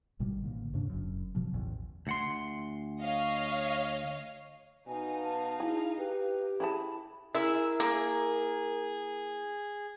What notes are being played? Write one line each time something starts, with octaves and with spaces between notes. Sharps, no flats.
G#1 B2 D#3 G3
A1 D3 A#3
D#2 G#2 C#3 D4
F#1 F#2
B2 D#3 F3 F#3
A1 E2
D2 F#5 C6
C#5 D#5 F5
B2 D#4 F5 G#5
A5
E4 G#4
G4 B4
E4 G#4 A5 B5
E4 G#4 A#4 E5
A#3 G#4